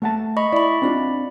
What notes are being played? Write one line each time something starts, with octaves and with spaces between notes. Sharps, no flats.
A3 F#5 A5
D#5 B5 C#6
E4 D5 B5
C4 D4 F4